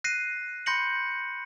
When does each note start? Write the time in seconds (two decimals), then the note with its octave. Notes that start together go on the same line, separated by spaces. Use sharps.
0.04 F#6 A#6 C7 D#7
0.66 B5 C6 G6 A#6 C#7 F#7